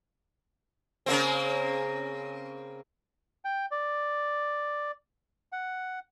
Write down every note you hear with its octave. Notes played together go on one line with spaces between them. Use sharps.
C#3 A#3 C4
G5
D5
F#5